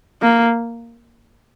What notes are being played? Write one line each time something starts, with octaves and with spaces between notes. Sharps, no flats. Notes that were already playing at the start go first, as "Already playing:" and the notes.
A#3